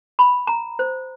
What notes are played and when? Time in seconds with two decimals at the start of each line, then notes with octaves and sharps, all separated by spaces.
0.19 B5
0.47 A#5
0.79 C5